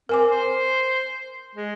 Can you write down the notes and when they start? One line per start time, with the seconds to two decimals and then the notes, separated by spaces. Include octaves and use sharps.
0.09 C4 A#4 G#5 D6
0.31 C5
1.55 G#3